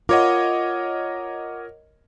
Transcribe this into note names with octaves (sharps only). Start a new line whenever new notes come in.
F4 A#4 C#5 D#5 F#5 D6